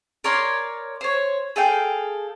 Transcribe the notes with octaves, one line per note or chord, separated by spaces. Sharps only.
A#4 C#5 D5 C6
C5 C#5
G#4 A4 F5 G5